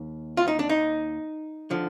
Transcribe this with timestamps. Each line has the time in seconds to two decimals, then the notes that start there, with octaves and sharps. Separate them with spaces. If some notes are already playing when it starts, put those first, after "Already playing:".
Already playing: D#2
0.37 F4
0.48 D#4
0.59 D4
0.69 D#4
1.71 D3 F3